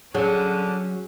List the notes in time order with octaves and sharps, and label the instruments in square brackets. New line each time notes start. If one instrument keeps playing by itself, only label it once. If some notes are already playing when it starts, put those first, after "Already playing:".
[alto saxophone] D3 [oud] F#3 [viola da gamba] C#4 [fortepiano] G#4